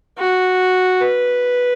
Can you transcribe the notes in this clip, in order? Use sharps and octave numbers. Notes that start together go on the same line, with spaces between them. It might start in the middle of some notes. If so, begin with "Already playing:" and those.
F#4
B4